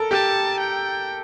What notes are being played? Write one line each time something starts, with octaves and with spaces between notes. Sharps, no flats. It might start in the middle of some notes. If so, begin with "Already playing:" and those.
Already playing: A4 A#4
G4 A5
G5